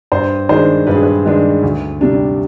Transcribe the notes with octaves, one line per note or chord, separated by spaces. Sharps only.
G2 C5
D#3 G#3 D4 C5
G2 B4
G#4
B4
D#3 G#3 D4 B4
D2
C3 G3 D4